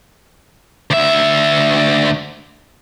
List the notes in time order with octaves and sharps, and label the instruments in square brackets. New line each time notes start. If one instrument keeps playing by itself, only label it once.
[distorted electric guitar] D2 E5